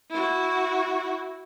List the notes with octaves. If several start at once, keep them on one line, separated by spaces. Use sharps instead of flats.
E4 F#4